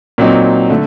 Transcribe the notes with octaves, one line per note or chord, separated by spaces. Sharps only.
A#2 F#3 C4 D#4
D3 A3